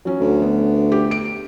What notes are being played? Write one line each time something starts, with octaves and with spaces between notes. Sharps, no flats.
F#3 C#4
D2
B3
G4
D7